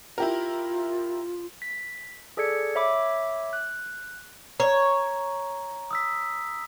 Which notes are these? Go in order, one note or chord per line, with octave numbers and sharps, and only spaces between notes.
E4 F4 G4 A#4
B6
G#4 A4 D5 G#6 C#7
C#5 E5 B5 D6
F#6
C#5 A#5
D#6 E6 B6